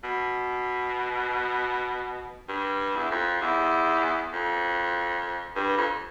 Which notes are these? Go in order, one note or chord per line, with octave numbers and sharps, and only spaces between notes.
B2
G2
E2
F2
E2
F2
G2
F2